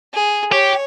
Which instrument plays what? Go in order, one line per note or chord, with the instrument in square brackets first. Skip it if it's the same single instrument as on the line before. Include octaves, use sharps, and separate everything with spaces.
[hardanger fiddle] G#4
[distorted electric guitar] G4 [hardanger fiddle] C#5